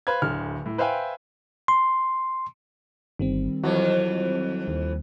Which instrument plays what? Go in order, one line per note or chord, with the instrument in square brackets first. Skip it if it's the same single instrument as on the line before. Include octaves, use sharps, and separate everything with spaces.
[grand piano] B4 C5 F5 G#6
D1 D2 F6
A2
B4 C5 E5 F5 G5 G#5
[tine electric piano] C6
[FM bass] G1 [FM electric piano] D#3 G3 C4
[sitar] F2 E3 [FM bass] F#3
[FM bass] D#2